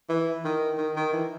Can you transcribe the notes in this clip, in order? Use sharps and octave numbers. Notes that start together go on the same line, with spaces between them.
E3
D#3
D#3
D#3
E3